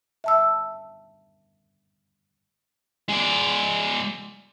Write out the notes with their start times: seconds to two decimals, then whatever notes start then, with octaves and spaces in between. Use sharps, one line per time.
0.24 E5 A5 E6
3.09 G#3 D5